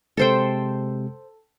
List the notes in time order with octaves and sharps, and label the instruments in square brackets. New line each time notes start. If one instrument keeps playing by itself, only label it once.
[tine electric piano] C3 G#3 [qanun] A4 C5 G5